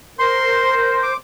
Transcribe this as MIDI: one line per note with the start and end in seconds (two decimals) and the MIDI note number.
0.19 1.12 70
0.19 1.12 72
0.19 0.75 84
1.03 1.17 86